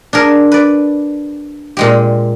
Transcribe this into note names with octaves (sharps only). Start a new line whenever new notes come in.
D4 G#4 A#4
B4 D5
A#2 G#3 G4